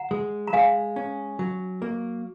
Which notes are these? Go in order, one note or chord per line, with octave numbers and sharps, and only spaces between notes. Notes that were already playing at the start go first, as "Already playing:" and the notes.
Already playing: F#5 A#5
G#3
A#5
G#3 F5 G#5
C#4
F#3
A#3